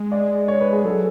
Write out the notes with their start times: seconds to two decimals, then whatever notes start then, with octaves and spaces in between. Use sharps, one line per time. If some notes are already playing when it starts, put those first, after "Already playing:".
Already playing: G#3
0.12 D5
0.48 C#5
0.61 B4
0.73 G#4
0.84 F#3 A4